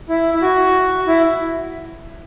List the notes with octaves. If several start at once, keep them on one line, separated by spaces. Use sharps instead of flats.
E4
E4
F#4
E4